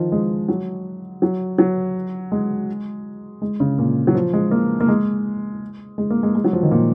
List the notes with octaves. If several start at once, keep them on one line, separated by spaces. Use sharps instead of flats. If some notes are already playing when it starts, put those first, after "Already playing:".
Already playing: D#3 F3
G#3
F#3
F#3
F#3
G#3
G#3
C#3
A#2
F#3
F3
G#3
A#3
A#3
G#3
G#3
A#3
G#3
G#3
F#3
F3
D#3
A#2